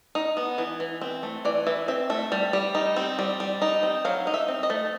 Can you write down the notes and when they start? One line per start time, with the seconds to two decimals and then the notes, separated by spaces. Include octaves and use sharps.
0.15 D#4
0.37 B3
0.58 E3
0.80 E3
1.01 C4
1.23 A3
1.45 E3 D5
1.67 E3 E5
1.88 C4 E5
2.10 A3 E5
2.32 G3
2.53 G3
2.75 D#4
2.96 C4
3.19 G3
3.40 G3
3.62 D#4
3.83 C4
4.05 F#3 F5
4.27 D#4
4.34 E5
4.48 C4
4.63 D#5
4.70 A3